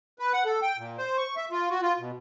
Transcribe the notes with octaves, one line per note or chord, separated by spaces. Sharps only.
B4
F#5
A4
G5
A#2
C5
C#6
E5
F4
F#4
F4
B2